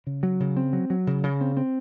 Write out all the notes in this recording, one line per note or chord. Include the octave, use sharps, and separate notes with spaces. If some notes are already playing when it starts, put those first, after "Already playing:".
C#3
F#3
C#3
C4
F#3
F#3
C#3
C#3
C4
C4